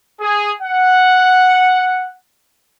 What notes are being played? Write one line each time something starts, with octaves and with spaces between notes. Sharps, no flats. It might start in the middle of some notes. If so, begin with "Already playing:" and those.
G#4
F#5